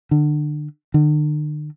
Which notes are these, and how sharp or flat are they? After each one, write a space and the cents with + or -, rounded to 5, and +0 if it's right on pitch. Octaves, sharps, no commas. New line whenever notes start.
D3 +30
D3 +45